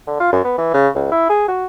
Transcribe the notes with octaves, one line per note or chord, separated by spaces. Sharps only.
D3
F4
F#2
B3
E3
C#3
C#2
E4
G#4
F#4